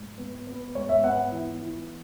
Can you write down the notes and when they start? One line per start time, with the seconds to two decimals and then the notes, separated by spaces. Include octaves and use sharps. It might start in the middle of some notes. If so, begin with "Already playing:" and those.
Already playing: G#2
0.18 B3
0.47 B3
0.75 G#2 C#5
0.89 E5
1.03 B3 F#5
1.32 E3
1.61 E3